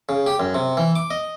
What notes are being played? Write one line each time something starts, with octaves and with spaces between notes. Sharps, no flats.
C#3
G4
F#2
C3
E3
D6
D#5